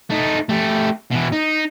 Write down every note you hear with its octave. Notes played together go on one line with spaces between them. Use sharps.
A3 D#4
A3 G4
B2 E3
D#4